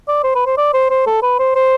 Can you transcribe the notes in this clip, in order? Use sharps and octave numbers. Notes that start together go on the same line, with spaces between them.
D5
C5
B4
C5
D5
C5
C5
A4
B4
C5
C5